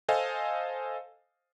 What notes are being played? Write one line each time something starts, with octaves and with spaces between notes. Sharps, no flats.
A4 C5 D#5 F5 G#5